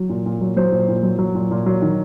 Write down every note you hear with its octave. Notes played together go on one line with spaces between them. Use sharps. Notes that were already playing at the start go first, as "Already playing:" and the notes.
Already playing: F#3
A#2
A#2
F#3
F#3 C5
A#2
A#2
F#3
F#3
A#2
A#2
F#3
D#3